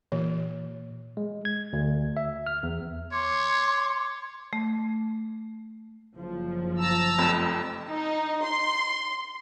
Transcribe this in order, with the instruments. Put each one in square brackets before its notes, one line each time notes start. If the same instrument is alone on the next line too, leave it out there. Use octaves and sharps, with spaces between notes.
[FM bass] A#2 [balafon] E3
[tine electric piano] G#3
G#6
D2
E5
F6
E2
[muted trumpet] C#5 [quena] C6 [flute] D6
[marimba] A3
[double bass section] F#1 F3
[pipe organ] A5 A#5 E6
[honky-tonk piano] F1 F2
[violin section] D#4
C6